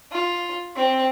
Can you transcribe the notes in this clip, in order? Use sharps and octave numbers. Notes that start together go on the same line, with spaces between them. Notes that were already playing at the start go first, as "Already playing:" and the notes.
F4
C4